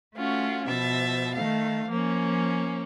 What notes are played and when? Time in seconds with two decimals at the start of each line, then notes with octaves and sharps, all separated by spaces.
0.15 A3 C#4 F4 F#4
0.67 B2 F3 E5 A6
1.33 D#3 A3 F5
1.90 F3 A#3 C#4